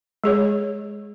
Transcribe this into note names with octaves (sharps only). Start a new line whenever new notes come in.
G#3 G#4 C#5